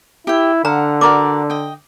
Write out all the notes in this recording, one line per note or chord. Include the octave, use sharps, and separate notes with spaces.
E4 G4 G5
D3 F5 F#5 A#5
F#4 A#4 D5 D6
D#5 G5